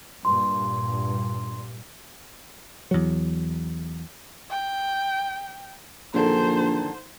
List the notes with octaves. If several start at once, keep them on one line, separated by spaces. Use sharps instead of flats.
G2 A#2 C6
E2 F#3
G5
A#1 F#2 D3 D#3 C5